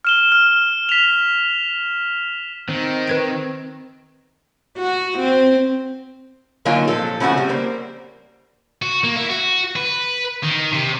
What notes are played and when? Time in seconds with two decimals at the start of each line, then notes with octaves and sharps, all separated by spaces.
0.05 F6 E7 G7
0.32 F6
0.89 B6 F7
2.69 D#3 C4
3.07 B4 G#6 D7
4.78 F#4
5.19 C4
6.65 D3 F#3 A#3 D#4 F4 G#5
6.88 A#2 F3 A4
7.20 C#3 F3 A3 B3 E4 F#4
7.37 G3
7.49 A#3 C5
8.82 F#4
9.04 A#3
9.16 E4
9.30 F#4
9.76 B4
10.43 D#3
10.73 C3